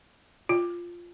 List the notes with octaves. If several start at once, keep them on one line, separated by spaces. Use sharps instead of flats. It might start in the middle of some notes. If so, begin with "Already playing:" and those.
F4